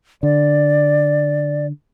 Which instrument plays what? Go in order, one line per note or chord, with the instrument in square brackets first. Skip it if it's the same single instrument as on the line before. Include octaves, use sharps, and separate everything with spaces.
[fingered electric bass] D3 [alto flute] D5